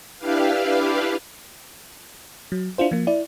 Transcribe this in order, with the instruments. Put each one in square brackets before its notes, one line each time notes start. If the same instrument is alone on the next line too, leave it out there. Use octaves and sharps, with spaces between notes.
[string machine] D4 E4 G4 B4 F5
[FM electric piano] F#3
D4 E4 F4 C5
F3 A#3
E4 D5